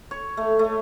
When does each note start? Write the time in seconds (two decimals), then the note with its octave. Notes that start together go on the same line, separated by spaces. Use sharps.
0.11 C#5
0.37 A3
0.59 A3